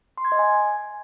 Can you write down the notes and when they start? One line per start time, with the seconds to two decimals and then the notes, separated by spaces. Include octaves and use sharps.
0.18 C6
0.25 G#6
0.32 D#5
0.39 G#5